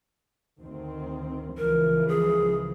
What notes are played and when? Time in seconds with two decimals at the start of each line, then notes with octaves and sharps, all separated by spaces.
0.60 D2 D#3 C4
1.58 C#2 E3 F3 A#4
2.08 G#4